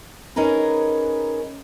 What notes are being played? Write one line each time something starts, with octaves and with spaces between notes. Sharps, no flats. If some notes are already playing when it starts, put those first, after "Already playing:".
C#4 D#4 G#4 A#4 B4